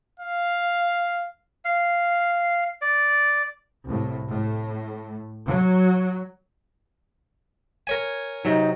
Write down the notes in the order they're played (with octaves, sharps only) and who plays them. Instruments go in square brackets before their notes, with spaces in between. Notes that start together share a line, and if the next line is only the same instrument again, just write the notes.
[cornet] F5
[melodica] F5
D5
[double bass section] C2 A2
A2
F#3
[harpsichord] A#4 C#5 G#5
[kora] C3 F#3 [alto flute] D#4